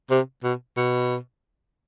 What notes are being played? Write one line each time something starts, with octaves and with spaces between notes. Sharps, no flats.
C3
B2
B2